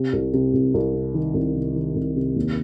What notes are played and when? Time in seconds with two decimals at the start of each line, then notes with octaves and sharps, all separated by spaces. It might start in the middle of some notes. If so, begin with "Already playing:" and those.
Already playing: C3
0.13 C2
0.33 C3
0.54 C2
0.74 C2
0.94 C3
1.14 D#3
1.34 C2
1.54 C3
1.75 D#3
1.96 C2
2.16 C3
2.36 D#2